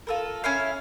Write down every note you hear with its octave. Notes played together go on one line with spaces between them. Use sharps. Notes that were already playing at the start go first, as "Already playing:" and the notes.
F4 A4 A#4
C#4 E4 F5